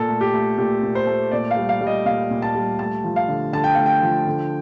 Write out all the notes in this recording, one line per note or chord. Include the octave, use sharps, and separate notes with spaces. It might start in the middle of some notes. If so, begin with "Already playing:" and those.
Already playing: A#2 A4
A3
G4
A3
A#2 G4
A#2
C5
A3
A#2 D5
F5
G3
F5
G3
D#5
A#2 F5
A#2
A5
G3
A3 A5
F3
F5
D3
D3 A5
G5
A3 F5
G5
F3
D3